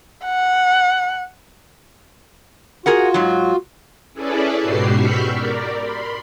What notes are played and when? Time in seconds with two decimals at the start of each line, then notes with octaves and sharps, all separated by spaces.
0.25 F#5
2.86 F4 F#4 G#4 A#4 F#5
3.14 G#2 F#3
4.13 C#4 E4 G#4 A4 B4 D5
4.59 G#2 B2 F#4 G4 C7
4.95 B5 C#6 E6 F6 G6 B6
5.30 A#4 D5
5.78 B5 C6